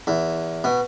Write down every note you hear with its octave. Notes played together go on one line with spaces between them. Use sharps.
E2
B2